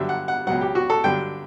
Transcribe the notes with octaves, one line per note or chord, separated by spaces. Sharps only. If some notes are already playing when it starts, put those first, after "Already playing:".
Already playing: G2 D3 F#3 E5
F#5
F#5
C#2 B2 F#3 F#5
G4
F#4
A4
G2 D3 F#3 G5